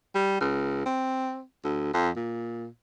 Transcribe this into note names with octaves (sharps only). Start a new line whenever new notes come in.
G3
C#2
C4
D2
F2
A#2